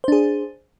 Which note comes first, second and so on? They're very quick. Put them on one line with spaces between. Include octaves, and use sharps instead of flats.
C5 D4 G#4